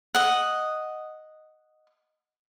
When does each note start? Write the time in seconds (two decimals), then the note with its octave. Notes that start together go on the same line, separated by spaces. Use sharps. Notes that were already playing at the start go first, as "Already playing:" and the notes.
0.15 D#5 F#5